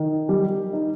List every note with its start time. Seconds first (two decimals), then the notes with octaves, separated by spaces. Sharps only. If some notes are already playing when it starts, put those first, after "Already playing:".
Already playing: D#3
0.29 G3
0.73 D#4